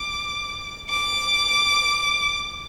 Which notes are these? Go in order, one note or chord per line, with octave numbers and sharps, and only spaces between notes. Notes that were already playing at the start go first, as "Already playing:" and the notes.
Already playing: D6
D6